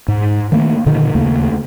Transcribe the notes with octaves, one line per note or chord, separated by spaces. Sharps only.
G#2
D#3 A3 A#3
A#2 D3 D#3
D#2 C#3 A3 A#3